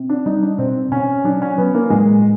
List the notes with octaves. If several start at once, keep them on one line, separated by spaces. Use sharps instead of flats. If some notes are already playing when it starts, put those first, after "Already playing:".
Already playing: B2 C4
D4
G3 D#4
D4
B2 C4
B2 C#4
F#3 D4
C#4
F#3 B3
A#3
A2 G#3